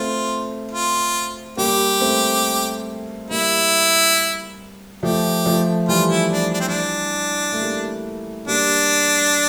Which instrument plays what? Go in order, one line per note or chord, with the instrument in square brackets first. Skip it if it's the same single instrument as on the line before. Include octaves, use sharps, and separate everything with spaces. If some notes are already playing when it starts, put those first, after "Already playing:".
Already playing: [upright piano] A3 C4 [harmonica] F4
[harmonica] F4
[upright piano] G3 A#3 [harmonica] G4
[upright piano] A3 C4
[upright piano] G3 A#3 [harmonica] E4
[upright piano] F3 A3 [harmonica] G4
[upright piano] F3 A3
[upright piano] E3 G3 [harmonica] F4
[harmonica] E4
D4
D4
C4
D4
[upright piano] A3
G3 A#3
[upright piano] G3 A#3 [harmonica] D4